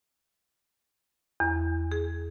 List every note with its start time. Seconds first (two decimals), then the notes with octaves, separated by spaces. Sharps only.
1.40 E2
1.92 G#4